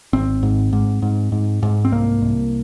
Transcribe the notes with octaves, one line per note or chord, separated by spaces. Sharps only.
G#1 C4
G#2
G#2
G#2
G#2
G#2
C4
C2 A#3
C2